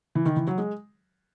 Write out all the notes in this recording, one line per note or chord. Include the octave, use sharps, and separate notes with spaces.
E3
D#3
E3
F#3
G#3